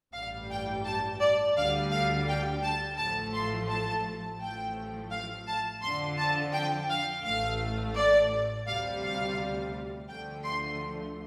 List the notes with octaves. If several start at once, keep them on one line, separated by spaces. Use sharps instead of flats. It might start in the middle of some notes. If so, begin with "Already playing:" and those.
A1 G2 G3 F5
G5
A5
D5
D2 D3 G3 F5
F5
G5
A5
A1 A2 F3 A3 A5
C6
A5
A1 A2 F3 A3 G5
F5
A5
F2 D3 F3 C6
A5
G5
F5
A1 A2 A3 F5
D5
D2 C3 G3 F5
F5
D2 D3 F3 A3 G5
C6